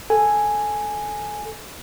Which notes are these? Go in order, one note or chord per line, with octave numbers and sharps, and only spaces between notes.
A4 G#5